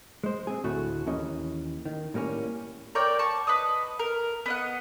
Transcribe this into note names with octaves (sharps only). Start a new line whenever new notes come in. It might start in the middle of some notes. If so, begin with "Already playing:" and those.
G#3 C5
C4 G#4
D2 A2 A3 F#4
D#2 E3 C#4 D#5
D#3
A2 G3 A#3 C4 C#4
A#4 C#5 D5 G5
A5 C#6
B4 D#5 D#6
A#4
B3 D#5 F#5